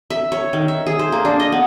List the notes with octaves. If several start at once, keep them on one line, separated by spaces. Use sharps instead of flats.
E5
C#5
D#3
E5
G#4
C5
A#3
D4
D#5
B3